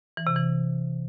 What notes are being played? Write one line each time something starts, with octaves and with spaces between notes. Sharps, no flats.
E3
C3
E3